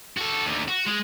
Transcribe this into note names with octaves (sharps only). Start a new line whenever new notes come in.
F#4 A4
D#2 D3
F#4
G#3